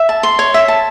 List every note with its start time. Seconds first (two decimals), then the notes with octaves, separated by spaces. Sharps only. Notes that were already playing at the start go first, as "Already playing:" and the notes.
Already playing: E5
0.09 A5
0.23 C6
0.39 C#5
0.54 E5
0.68 A5